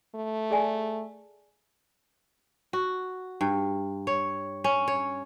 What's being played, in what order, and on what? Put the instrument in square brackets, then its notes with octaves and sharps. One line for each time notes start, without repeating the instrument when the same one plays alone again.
[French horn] A3
[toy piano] G#4 D5 G#5
[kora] F#4
G2
C#5
C#4
C#5